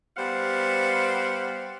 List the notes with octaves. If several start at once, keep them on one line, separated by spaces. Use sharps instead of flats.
G3 B3 C5 F5 F#5